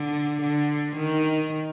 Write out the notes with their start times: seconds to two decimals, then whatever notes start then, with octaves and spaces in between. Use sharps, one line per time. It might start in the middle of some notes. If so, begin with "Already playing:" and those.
Already playing: D3
0.41 D3
0.96 D#3